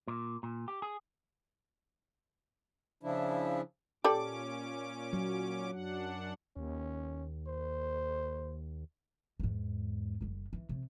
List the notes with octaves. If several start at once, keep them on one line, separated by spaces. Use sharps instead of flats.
A#2
A#2
G4
G#4
C#3 F3 D4 E4
A#2 C#4 G4 A4 D5 D6
F#3
F#2 D4 F#5
D#2 C#4
C5
E2 G#2
F#1 G3
E3
C3